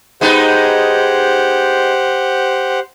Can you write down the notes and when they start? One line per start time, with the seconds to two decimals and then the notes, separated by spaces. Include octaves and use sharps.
0.21 G#3 B3 D#4 G4 C5 F#5